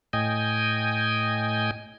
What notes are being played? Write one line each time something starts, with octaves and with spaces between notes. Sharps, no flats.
A2 D#5 G5 G#5